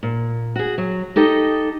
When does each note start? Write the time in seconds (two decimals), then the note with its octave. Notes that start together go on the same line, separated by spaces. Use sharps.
0.03 A#2
0.56 F#4 G#4
0.78 F#3
1.16 D#4 G4 A4 D#5